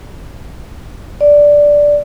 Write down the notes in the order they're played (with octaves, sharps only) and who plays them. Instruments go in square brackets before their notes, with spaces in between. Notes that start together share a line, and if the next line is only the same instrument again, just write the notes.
[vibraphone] D5